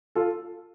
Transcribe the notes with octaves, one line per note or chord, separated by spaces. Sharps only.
F4 A4